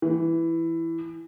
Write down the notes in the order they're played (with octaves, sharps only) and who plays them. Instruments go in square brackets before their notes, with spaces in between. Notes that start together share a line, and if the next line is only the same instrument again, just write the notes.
[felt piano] E3